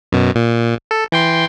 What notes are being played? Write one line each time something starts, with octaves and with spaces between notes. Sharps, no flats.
F#2 B2
A#2
A4
E3 G5 C6